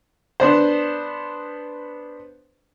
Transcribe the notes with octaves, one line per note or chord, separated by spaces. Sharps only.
B3 D4 C5